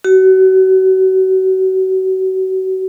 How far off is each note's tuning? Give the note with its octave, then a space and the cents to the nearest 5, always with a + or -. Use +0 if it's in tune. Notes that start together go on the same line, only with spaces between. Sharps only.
F#4 +35